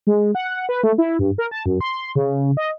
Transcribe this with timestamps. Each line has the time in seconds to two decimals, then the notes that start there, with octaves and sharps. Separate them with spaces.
0.07 G#3
0.35 F#5
0.69 B4
0.83 A3
0.98 E4
1.19 G2
1.38 A#4
1.51 A5
1.66 F#2
1.81 C6
2.16 C#3
2.57 D#5